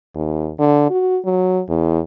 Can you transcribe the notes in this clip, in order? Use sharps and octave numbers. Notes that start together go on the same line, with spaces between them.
D#2
D3
F#4
F#3
E2